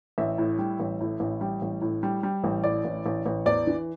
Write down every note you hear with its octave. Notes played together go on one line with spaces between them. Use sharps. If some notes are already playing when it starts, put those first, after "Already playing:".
A1 E5
A2
G3
A1
A2
A1
G3
A1
A2
G3
G3
A1
A2 D5
A1
A1
A1
E2 D5
E3